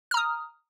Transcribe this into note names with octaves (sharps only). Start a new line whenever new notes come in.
A#5 D#6 F6